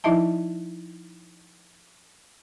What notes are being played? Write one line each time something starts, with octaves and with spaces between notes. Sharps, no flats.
F3 D#4 E4 D#5 E5 A5